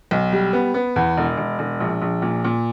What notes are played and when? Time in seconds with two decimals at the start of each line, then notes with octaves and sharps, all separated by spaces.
0.11 B1
0.32 G3
0.53 B3
0.74 B3
0.96 E2
1.17 E1
1.37 E1
1.59 E1
1.80 A#1
2.02 A#1
2.22 A#2
2.44 A#2